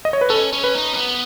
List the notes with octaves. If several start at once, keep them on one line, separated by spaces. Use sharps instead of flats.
D#5
C#5
B4
C#4 A4
C#4
B4
D#4
C#4
B3